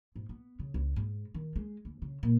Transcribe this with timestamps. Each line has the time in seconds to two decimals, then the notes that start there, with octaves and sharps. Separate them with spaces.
0.16 G#2
0.29 B3
0.59 C#3
0.74 C#2
0.96 G#2
1.34 D#3
1.56 G#3
1.85 D2
2.02 C#3
2.23 A#2